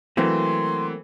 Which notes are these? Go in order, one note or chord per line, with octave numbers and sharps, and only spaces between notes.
E3 F#3 A3 A#3 C4 C6